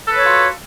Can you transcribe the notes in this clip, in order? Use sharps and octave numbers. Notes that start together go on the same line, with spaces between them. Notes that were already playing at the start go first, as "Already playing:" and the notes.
F4 F#4 A4 B4 C#5